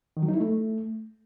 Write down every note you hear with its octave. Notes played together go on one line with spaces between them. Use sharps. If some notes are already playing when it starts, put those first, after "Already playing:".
D#3
F#3
D#4
E4
A3